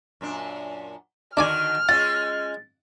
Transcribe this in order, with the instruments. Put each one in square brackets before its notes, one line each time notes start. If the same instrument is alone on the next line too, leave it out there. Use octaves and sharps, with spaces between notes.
[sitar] F#2 A#2 D4
[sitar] D3 D#3 F#4 [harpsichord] D4 D5 G#5 [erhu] F6
[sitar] G#3 C#4 F4 [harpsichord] F#5 [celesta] A6